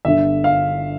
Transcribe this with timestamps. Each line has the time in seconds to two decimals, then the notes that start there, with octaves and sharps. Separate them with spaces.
0.05 G1 G2 D3 E5
0.44 F5